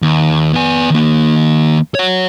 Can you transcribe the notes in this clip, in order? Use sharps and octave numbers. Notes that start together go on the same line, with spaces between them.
D#2
B3 G#5
D#3 A#3
C#5 F#5